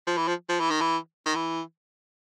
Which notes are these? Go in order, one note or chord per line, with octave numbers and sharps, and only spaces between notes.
F3
E3
F3
F3
E3
D#3
E3
D#3
E3